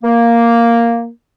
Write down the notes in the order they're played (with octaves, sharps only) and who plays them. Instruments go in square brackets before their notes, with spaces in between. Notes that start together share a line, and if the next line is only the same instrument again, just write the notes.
[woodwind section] A#3